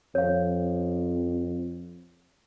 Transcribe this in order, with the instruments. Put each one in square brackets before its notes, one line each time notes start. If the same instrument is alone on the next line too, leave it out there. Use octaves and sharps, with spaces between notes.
[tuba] F2 [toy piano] C#5 F5